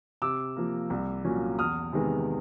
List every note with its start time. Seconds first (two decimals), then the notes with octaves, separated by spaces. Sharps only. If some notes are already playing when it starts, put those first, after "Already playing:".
0.22 C3 D6 E6
0.57 F3 A#3
0.90 C2
1.25 A#2 F#3 A#3 C#4
1.58 E2 D#6 F6
1.93 C3 D#3 G#3 B3